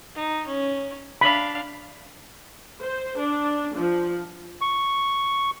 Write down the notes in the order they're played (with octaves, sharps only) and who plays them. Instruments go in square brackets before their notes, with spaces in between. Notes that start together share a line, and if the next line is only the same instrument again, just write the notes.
[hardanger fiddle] D#4
C#4
[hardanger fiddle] D4 F5 [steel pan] B5
[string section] C5
D4
F3
[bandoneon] C#6